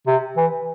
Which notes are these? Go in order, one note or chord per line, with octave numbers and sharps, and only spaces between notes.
C3
E3